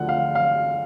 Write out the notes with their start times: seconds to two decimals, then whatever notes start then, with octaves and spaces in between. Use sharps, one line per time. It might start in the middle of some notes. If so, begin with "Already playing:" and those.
Already playing: D2 D3 F3 F#5
0.09 F5
0.35 F5